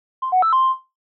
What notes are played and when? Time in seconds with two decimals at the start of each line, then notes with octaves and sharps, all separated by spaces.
0.22 C6
0.32 F#5
0.42 E6
0.53 C6